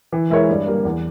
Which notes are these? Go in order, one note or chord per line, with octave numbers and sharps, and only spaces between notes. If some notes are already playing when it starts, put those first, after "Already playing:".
E3
G#3 E4 A#4 C#5
G2
G3 A#3
E2